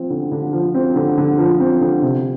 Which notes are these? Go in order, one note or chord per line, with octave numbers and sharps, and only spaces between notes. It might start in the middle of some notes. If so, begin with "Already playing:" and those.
Already playing: F3 C4
D3
D3
F3
C4
D3
D3
F3
C4
D3
C3